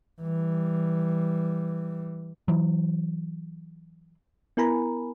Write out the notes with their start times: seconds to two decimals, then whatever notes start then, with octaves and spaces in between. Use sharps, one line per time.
0.22 E3 G3
2.48 E3 F#3
4.57 B3 E4 A#4 G#5 A#5 B5